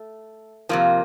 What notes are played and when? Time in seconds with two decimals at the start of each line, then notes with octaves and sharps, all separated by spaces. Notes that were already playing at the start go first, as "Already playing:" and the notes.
Already playing: A3
0.69 F2 C3 F3 A#3